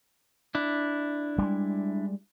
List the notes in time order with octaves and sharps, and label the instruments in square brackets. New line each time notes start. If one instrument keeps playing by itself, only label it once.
[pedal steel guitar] D4 E4
[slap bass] G3 G#3